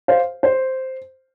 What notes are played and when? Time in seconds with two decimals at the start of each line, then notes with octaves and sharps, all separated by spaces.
0.08 C5 F5
0.43 C5